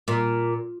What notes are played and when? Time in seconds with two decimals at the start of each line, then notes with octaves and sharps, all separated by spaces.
0.08 A#2